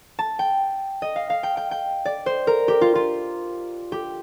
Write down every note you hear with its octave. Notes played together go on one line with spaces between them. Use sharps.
A5
G5
D#5
F5
F5
G5
G5
G5
D5
C5
A#4
G4
F4
F4
G4